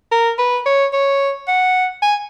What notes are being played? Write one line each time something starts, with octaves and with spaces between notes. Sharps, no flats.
A#4
B4
C#5
C#5
F#5
G#5